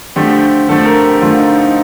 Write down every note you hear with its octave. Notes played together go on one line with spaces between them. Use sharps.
D3 F3 A3 C4 G4
D3 F3 A3 C4 A4
A#4
G4
D3 F3 A3 C4 F4
D#4
D#4